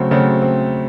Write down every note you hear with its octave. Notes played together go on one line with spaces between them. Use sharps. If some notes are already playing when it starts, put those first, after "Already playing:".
Already playing: C#3 F#3 A3 C4
C#3 F#3 A3 C4
C4